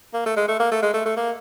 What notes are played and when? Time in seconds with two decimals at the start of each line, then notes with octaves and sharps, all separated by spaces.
0.14 A#3
0.26 A3
0.37 G#3
0.49 A3
0.60 A#3
0.72 A3
0.83 G#3
0.94 A3
1.06 A3
1.17 A#3